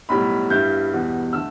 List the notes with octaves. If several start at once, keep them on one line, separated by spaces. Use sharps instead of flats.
B1 A2 G3 B5
G2 G3 E4 G6
E2 B2 G3
D3 A3 E6